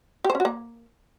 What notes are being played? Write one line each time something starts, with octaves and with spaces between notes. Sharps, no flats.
G4
C5
C#4
F#4
A#3